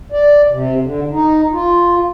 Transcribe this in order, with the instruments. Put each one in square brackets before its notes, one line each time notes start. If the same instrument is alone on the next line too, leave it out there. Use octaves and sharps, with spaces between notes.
[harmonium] D5
C3
D3
D#4
F4